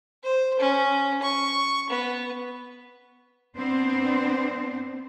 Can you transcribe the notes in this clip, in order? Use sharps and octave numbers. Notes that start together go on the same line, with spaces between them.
C5
C#4
C#6
B3
B3 C4 D4 C5